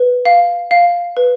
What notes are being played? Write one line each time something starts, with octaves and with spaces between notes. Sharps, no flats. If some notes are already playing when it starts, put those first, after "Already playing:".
Already playing: B4
F5
F5
B4